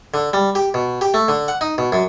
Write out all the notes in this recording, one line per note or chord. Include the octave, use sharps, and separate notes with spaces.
D3
G3
G4
B2
G4
A3
D3
F#5
D#4
B2
F#2